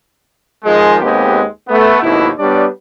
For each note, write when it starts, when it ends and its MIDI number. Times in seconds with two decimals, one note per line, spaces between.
0.65 0.98 51
0.65 0.98 53
0.65 0.98 56
1.01 1.43 39
1.01 1.43 56
1.01 1.43 59
1.01 1.43 60
1.01 1.43 67
1.69 1.98 57
1.69 1.98 59
2.02 2.29 32
2.02 2.29 39
2.02 2.29 47
2.02 2.29 64
2.39 2.66 55
2.39 2.66 59
2.39 2.66 62
2.39 2.66 73
2.39 2.66 74